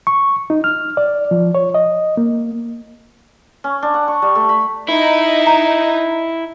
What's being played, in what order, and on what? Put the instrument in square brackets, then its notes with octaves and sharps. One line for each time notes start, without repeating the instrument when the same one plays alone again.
[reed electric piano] C#6
D#4
F6
D5
F3
C#5
D#5
A#3
[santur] C#4
D4
F#5
C#6
G3
A3
B5
[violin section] D#4 [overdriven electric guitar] E4
[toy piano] A#5